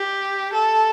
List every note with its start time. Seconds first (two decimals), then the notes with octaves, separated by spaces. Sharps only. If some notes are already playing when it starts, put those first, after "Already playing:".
Already playing: G4
0.53 A4